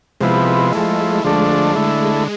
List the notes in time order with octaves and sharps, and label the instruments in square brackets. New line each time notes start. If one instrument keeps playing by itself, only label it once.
[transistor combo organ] C3 F3 B3 E4 [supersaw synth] G#3
[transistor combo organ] F3 A3 E4 [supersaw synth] G#3
[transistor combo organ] D3 F3 A3 D4
D3 A3 E4